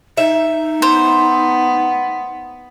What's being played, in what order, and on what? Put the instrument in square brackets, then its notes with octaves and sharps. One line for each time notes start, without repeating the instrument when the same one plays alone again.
[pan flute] D#4 [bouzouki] E5
[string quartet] B3 [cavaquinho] C5